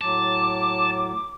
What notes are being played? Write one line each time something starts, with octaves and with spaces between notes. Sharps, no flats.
A2 F#3 A5 D6